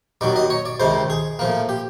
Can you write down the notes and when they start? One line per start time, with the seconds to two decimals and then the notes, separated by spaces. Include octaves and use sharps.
0.21 D#2 D#3 F#3 D5
0.36 D#5
0.50 C#5
0.65 D5
0.80 C#2 C3 D#3 C5
1.10 G#4
1.39 A2 F3 A#3
1.69 G4